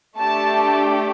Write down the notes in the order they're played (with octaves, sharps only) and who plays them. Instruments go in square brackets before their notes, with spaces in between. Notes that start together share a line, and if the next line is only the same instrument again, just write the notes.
[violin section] A3 D4 G4 A5